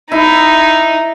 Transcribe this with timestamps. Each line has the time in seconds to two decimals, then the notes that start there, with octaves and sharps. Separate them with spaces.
0.12 D#4 E4